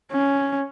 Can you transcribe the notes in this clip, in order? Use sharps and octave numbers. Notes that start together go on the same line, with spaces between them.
C#4